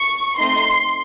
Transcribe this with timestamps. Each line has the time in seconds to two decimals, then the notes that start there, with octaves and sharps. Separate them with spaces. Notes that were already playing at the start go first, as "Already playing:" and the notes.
Already playing: C#6
0.38 A3 C4 D#4 C6